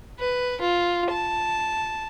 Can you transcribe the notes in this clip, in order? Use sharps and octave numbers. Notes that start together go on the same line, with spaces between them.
B4
F4
A5